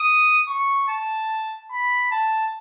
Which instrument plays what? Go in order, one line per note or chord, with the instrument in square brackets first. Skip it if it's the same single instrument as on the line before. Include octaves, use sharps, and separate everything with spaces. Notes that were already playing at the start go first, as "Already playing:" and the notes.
Already playing: [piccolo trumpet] D#6
C#6
A5
B5
A5